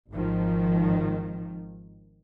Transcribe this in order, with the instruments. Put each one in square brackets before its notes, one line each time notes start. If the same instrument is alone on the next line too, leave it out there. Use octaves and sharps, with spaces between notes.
[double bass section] G#1 G#2 D#3 F3